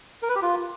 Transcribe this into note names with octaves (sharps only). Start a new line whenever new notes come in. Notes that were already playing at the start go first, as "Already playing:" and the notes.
A#4
B4
G4
F4